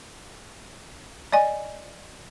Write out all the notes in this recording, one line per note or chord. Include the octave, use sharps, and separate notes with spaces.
D5 D#5 G#5